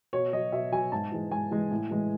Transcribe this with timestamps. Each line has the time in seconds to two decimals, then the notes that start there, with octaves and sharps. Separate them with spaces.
0.13 B2 C#5
0.32 F#3 D#5
0.52 B2 E5
0.72 F#3 G#5
0.92 G#2 A5
1.12 E3 G#3
1.31 G#2 G#5
1.51 E3 G#3
1.71 A2
1.91 E3 G#3